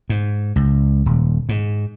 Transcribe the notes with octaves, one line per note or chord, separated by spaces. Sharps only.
G#2
C#2
D#1
G#2